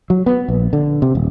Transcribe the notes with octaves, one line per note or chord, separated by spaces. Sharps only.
F#3
B3
A#1
D3
C3
D#1